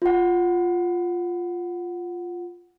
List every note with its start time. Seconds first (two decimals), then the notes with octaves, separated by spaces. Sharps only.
0.02 F4 F#5